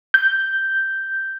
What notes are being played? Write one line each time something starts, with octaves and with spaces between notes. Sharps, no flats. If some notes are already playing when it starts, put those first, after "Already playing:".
G6